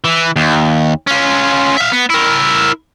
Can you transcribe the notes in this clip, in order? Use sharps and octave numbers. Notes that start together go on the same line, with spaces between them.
E3
D#2
C#4 F4
E5 F5
B3
E4 A#4